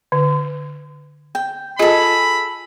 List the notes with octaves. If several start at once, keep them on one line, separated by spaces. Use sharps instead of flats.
D3
G5
F4 G#4 A4 D#5 B5